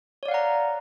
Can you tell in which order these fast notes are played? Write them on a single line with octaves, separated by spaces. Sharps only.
C#5 D5 F5 F#5 A#5